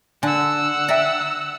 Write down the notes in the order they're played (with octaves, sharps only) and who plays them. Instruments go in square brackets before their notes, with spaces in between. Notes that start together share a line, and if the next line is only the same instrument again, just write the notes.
[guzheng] D3 [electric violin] F#5 E6 [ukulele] G#5
[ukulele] D5 E5 G5 [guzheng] A#5